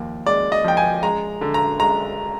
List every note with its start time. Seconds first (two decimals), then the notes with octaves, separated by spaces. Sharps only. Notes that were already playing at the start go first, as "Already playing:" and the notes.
Already playing: D#2 F3
0.26 G#3 D5
0.52 D#5
0.64 F3 G5
0.77 G#5
1.03 G#3 A#5
1.41 D3
1.54 A#5
1.80 G#3 A#5